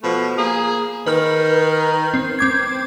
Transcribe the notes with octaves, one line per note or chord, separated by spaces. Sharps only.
B2 F3 A3
A#3 G#4
D#3 B4 F6
C4
C4 D6 G#6